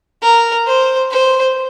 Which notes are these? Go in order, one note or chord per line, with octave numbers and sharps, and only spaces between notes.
A#4
C5
C5